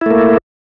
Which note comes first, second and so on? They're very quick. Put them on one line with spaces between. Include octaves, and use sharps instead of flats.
E4 A3 A#3